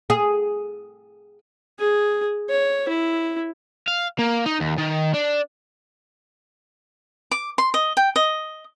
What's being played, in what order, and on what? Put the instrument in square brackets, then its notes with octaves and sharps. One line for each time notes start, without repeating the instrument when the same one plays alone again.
[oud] G#4
[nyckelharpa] G#4
C#5
E4
[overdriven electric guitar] F5
A#3
D#4
D#2
D#3
D4
[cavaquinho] D6
C6
D#5
G5
D#5